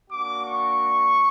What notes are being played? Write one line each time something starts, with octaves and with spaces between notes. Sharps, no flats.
A#3 D4 F#4 D6
C#6